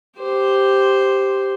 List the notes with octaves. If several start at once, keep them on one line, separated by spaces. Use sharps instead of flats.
G4 C5